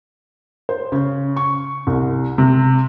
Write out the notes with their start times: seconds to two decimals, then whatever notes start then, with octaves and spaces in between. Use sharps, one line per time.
0.69 C5
0.92 C#3
1.36 C#6
1.87 C2
2.38 C3